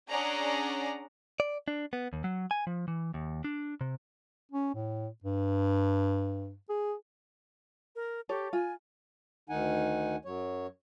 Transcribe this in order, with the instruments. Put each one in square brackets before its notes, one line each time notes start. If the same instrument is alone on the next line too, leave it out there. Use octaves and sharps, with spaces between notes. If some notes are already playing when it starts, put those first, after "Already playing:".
[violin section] C#4 D4 G#4 D5 F#5 A#5
[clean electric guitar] D5
D4
B3
D#2
F#3
G#5
F3
E3
D#2
D4
C3
[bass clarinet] C#4
A2
G2
G#4
[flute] A#4
[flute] G4 [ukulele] A4 C#5
[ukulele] F4 [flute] G#5
[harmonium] D2 D#3 D#4 F#5 G#5
F#2 F#3 C#5